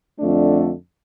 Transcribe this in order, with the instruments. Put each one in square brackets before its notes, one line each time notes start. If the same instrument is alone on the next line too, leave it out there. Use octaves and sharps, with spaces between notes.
[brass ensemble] F2 D3 A3 D4